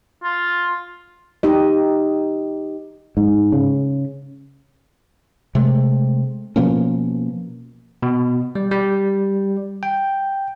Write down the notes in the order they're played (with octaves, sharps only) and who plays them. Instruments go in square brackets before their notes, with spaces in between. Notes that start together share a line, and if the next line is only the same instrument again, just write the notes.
[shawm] F4
[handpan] D#4 G4 D#5
[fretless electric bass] G#2
C#3
[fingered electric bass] C3 G#3 A3
B2 F3 A#3 C#4
[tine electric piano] B2
G3
G3
G5